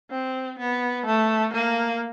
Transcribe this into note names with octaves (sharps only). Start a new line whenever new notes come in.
C4
B3
A3
A#3